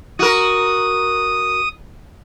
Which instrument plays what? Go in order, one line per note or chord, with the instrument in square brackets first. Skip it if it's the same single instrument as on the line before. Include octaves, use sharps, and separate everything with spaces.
[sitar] F#4 A#4 [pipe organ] D#6